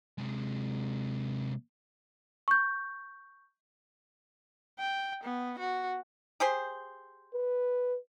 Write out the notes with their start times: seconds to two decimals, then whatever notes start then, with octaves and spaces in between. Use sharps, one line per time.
0.18 C3 G#3
2.48 C#6 G6
4.79 G5
5.24 B3
5.59 F#4
6.40 G4 G#4 C5
7.35 B4